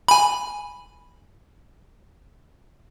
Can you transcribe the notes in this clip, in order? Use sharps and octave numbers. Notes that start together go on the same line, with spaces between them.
G#5 B5